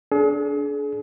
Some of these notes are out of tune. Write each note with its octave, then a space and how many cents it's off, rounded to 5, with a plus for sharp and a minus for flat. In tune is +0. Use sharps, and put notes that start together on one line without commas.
D4 -20 G#4 +40